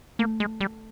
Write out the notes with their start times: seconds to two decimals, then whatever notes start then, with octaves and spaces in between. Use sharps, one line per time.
0.19 A3 A#3
0.40 G#3
0.61 G3